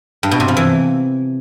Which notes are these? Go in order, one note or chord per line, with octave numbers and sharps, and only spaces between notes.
G2
B2
C3
F3
E3